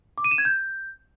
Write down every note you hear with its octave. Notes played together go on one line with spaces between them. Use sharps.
D6
D#7
E7
G#6
G6